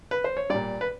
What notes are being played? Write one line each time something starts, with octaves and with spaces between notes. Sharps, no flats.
B4
C5
C#5
A#2 G3 D5
B4